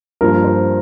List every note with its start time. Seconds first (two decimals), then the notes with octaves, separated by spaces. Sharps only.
0.21 G2 F3 A#3 A#4
0.44 C5